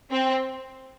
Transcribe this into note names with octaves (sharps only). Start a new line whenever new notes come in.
C4